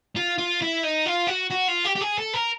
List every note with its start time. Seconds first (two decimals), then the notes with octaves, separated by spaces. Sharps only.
0.16 F4
0.38 F4
0.62 E4
0.84 D#4
1.06 F4
1.27 F#4
1.50 F#4
1.68 F4
1.84 G4
1.96 G4
2.00 G#4
2.18 A4
2.33 A#4